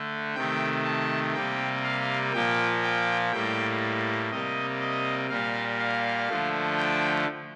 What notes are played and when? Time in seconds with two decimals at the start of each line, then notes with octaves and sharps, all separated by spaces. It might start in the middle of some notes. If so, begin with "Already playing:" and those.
Already playing: D3 A3
0.35 C3 D#3 A3 G5
0.85 A5
1.34 C3 G3 A#3 G5
1.84 F5
2.33 A#2 F3 A#3 G5
2.83 G5
3.32 A2 G3 A#3 G5
4.31 C3 G3 A#3 D#5
4.81 D#5
5.30 A#2 G3 A#3 F5
5.79 F5
6.28 D3 F3 A3
6.78 G5